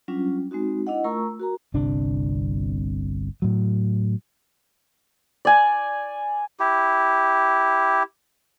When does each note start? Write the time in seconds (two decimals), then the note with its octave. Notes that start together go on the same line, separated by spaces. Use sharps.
0.08 F#3 G3 C#4 D4 F4
0.51 G#3 C4 D#4 F#4
0.87 D4 E4 D#5 F#5
1.04 A3 F4 A#4 A#5 C#6 E6
1.40 F#4 A#4 A#5
1.74 G1 C2 C3 D4
3.42 A2 F#3
5.45 D5 G#5
6.60 E4 G4